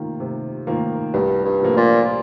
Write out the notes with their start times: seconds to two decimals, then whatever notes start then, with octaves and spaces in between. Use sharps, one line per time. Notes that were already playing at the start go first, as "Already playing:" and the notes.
Already playing: C3 D#3 A#3 F4
0.20 C3
0.67 D#3 A#3 F4
1.14 C2 G2
1.45 G2
1.62 C3 F3 A#3
1.77 A#2